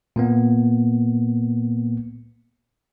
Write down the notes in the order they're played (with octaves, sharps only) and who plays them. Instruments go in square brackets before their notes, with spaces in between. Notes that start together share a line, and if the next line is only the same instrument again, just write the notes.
[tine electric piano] A#2 A#3 B3